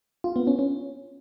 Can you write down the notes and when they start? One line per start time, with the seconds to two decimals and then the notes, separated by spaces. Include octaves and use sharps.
0.24 F4
0.36 B3
0.47 C#4
0.59 C#4